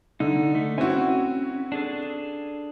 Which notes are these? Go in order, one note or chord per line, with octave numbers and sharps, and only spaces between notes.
D3 D#4
A3
C4 C#4 E4 F#4
D4 G#4 A4